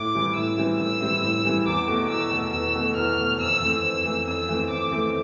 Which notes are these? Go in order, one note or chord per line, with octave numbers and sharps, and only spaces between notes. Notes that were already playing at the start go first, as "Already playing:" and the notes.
Already playing: A2 D6
E3 G3 C4 E4
A2 E6
E3 G3 C4 E4
A2 E6
E3 G3 C4 E4
A2
E3 G3 C4 E4
E2 D6
B2 A3
E2 E6
B2 A3
E2 E6
B2 A3
E2 F6
B2 A3
F2 E6
E3 A3 C4
F2 E6
E3 A3 C4
F2 E6
E3 A3 C4
F2 D6
E3 A3 C4